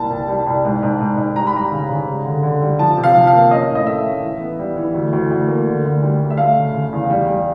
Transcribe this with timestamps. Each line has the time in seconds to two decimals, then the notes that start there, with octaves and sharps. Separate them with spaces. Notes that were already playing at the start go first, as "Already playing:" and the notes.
Already playing: C2 A#3 A5
0.11 C2
0.28 G3
0.47 C2
0.65 G#2
0.83 G#2
1.01 G#2
1.17 G#2
1.36 G3 A#5
1.47 B5
1.53 G3 A#5
1.71 C#3
1.89 C#3
2.08 G3
2.25 D3
2.43 D3
2.62 G3
2.79 F3 A5
2.97 C3
3.04 F5
3.15 F3
3.27 F5
3.33 A#3
3.51 C#4 D#5
3.70 A2
3.75 D#5
3.87 A3 E5
4.05 C#4
4.23 E3
4.40 B3
4.59 G3
4.77 E3
4.94 D2
5.13 D2
5.31 D2
5.48 A#3
5.67 D3
5.84 D2
6.03 G3
6.20 D2
6.30 E5
6.37 A3 F5
6.56 C#3
6.74 C#3
6.92 E2
7.10 G3
7.28 G3